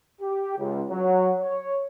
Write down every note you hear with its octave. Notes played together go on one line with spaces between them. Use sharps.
G4
C#2
F#3
C#5